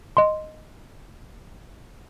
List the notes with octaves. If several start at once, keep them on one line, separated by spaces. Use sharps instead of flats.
D#5 C6